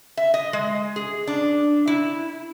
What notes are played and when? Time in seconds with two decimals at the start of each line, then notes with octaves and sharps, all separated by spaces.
0.17 E5
0.34 D#5
0.53 G#3
0.96 G#4
1.27 D4
1.87 E4